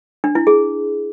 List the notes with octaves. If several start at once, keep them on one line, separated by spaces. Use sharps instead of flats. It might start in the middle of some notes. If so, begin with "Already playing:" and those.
D4
E4
G#4